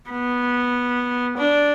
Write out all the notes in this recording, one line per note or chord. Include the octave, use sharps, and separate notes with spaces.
B3
D4